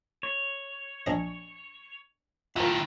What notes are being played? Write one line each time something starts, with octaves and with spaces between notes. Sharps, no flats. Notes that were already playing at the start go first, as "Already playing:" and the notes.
C#5
A#1 D#5
D#3 E4 F4 A#4 F#5